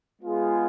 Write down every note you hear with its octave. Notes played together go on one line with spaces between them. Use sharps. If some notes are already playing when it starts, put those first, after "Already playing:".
G#3 B3 F4 G#4